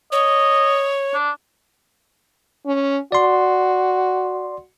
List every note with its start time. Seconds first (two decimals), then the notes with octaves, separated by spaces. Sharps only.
0.12 C#5 D#5
1.14 D4
2.66 C#4
3.12 F#4 D5 C6